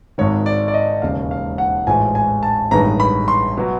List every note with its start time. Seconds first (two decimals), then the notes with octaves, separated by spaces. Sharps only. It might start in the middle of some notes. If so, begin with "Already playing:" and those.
0.18 G#1 G#2 D#3 C#5
0.46 D5
0.68 D5
0.74 D#5
1.02 E1 D#2 C#3 F5
1.31 F5
1.58 F#5
1.87 A1 G#2 F3 G#3 G#5
2.15 G#5
2.43 A5
2.71 A1 G2 D#3 G#3 B3 A#5
3.00 B5
3.28 C6
3.57 B2 F#3